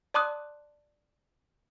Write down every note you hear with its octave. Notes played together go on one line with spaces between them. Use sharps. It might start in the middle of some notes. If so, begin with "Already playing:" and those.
D5 A5 C6 D6 D#6 F#6